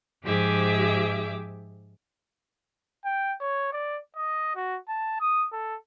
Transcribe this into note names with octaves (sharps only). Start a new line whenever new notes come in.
G#2 F3 G4 G#4 E5 D6
G5
C#5
D5
D#5
F#4
A5
D#6
A4